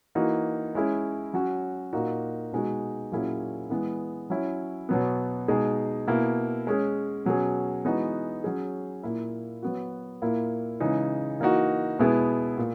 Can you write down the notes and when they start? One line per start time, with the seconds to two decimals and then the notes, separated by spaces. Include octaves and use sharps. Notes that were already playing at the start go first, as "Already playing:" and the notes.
0.15 E3 A#3 D#4 F#4
0.75 G#3 C#4 E4 G#4
1.34 F#3 C#4 F#4
1.93 A#2 A#3 D#4 F#4
2.52 B2 G#3 D#4 F#4
3.12 A#2 F#3 C#4 E4 G#4
3.70 E3 G#3 B3
4.30 F#3 C#4 E4
4.89 B2 F#3 B3
5.48 B2 G#3 D#4 G#4
6.07 B2 A#3 E4
6.67 G#3 C#4 G#4
7.25 B2 F#3 C#4 G#4
7.85 E3 G#3 B3 D#4 F#4
8.44 F#3 C#4 G#4
9.03 A#2 A#3 E4
9.63 F#3 B3 F#4
10.22 A#2 A#3 E4
10.80 C#3 E3 G#3 D#4
11.40 E3 A#3 D#4 F#4
11.99 B2 G#3 B3 E4 G#4
12.58 A#2